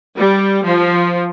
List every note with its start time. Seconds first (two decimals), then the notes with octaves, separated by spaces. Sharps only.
0.16 G3
0.66 F3